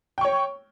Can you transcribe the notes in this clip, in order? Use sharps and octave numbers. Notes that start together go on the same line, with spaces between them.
C#5 G5 C#6